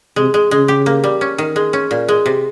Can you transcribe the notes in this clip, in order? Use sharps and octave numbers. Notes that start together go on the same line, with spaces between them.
C3 G#3
G#3
C#3 G#3
G4
A#3
G3
C#4
D#3
G#3
C#4
A#2
G#3
C3